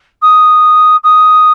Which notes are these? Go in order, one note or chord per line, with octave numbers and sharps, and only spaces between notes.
D#6
D#6